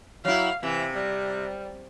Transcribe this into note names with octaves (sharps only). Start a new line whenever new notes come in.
F#3 E4 F5
C3 E3
G3